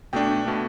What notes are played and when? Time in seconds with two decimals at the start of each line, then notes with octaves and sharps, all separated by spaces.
0.13 B2 A3 D4 G5
0.45 B2 A3 D4